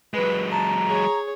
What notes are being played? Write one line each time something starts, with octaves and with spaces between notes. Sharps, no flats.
F#3 G#3 B4
A5 A#5
G#4 C#5